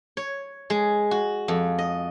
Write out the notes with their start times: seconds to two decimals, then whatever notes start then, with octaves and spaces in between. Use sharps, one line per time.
0.17 C#5
0.70 G#3
1.11 F#4
1.48 F2
1.78 D#5